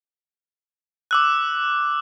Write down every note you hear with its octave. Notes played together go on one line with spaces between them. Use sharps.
D6 E6 F#6